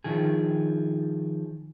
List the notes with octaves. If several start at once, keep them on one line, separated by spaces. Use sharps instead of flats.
D#3 F3 G#4